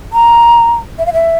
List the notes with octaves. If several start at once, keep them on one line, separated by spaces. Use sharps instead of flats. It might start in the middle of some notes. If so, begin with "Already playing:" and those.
A#5
E5
F5
E5